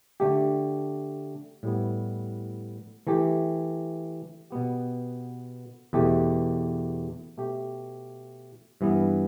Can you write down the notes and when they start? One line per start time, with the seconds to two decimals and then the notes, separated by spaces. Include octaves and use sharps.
0.20 D3 A3 G4
1.63 A2 G3 B3
3.07 E3 A3 G4
4.50 B2 B3 G4
5.93 E2 B2 A3 G4
7.37 B2 A3 G4
8.81 G2 E3 B3